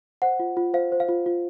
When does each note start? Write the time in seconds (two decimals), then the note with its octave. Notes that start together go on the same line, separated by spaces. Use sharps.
0.22 C5 F#5
0.40 F4
0.57 F4
0.74 C5 F5
0.92 C5
1.00 F5
1.09 F4
1.26 F4